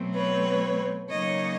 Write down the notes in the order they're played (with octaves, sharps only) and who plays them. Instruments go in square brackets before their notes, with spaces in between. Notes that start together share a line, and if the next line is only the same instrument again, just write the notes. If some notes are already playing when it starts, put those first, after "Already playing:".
Already playing: [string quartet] B2 F#3 A3 C4
B4 C#5
C#3 F#3 A#3 D#4 C#5 D#5